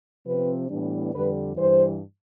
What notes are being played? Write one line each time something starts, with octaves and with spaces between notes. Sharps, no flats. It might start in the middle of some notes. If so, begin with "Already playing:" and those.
C3 F3 C4 B4
A2 E3 G3 B3 D4
F2 D3 G3 B4
G2 E3 G3 C5